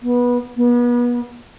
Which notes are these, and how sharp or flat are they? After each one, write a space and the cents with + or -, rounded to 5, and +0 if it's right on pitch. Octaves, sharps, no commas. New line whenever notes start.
B3 -20
B3 -35